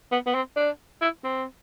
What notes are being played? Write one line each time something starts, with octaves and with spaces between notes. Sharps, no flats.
B3
B3
C4
D4
E4
C4